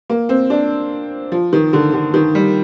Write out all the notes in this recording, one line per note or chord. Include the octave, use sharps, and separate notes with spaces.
A#3
C4
D4
F3
D#3
D3
D3
D#3
G3